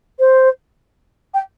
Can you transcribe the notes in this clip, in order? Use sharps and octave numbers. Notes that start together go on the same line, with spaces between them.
C5
G5